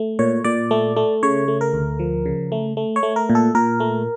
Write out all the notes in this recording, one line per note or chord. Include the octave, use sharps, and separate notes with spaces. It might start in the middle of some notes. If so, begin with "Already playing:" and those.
Already playing: A3
A#2 C#5
A#2 D5
A3
A3
C#3 C#5
A3
A#4
D2
F3
C#3
A3
A3
C#5
A3
A#4
A#2
A4
A#2 A#4
A3